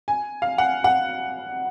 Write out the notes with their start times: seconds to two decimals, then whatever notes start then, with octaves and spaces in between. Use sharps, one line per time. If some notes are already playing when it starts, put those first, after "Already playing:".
0.08 G#5
0.42 F5
0.58 F#5
0.84 F#5